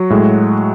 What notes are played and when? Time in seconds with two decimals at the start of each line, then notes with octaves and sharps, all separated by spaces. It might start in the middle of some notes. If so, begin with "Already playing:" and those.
Already playing: F#3 F#4
0.10 A2 G#3